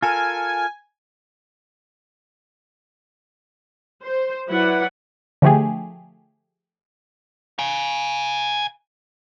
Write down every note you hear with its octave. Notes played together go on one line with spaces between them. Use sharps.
F4 A4 A#4 G#5
C5
F#3 E4 B4 D5 F#5
D3 F3 A3 G4 G#4
F5 G#5